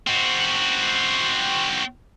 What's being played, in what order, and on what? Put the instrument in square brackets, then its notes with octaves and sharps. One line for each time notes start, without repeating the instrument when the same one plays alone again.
[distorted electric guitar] C4 F#4